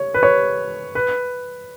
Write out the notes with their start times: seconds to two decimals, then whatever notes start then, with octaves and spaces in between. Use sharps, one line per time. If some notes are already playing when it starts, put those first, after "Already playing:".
Already playing: C#5
0.14 B4
0.23 C#5
0.95 B4